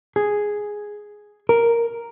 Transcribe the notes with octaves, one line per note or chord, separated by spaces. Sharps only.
G#4
A#4